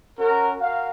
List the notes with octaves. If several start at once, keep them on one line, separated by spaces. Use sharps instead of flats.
C#4 F#4 A#4
F#4 A#4 F5